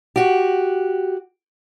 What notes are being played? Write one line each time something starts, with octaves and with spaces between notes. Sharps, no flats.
F#4 G4